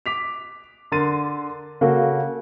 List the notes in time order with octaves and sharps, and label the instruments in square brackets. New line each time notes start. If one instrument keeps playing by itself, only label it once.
[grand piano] D6 B6 F7
D3 A#4 C6 A6 D#7
C#3 A#3 F#4 A4